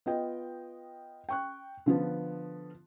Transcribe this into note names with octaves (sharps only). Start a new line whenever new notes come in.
B3 F4 D#5 G5
G5 C#6 F#6
D3 F3 B3